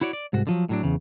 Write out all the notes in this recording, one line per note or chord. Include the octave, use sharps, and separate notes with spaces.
E4 F#4 C#5 D5
D5
C2 G#2 F#4
D3 F3 F#3
A2 F#3 D4
E2 C#3